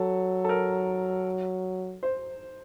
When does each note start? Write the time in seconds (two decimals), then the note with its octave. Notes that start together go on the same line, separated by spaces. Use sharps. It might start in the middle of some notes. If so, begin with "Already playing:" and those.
Already playing: F#3 A4
0.45 A4
0.49 A#4
2.03 C5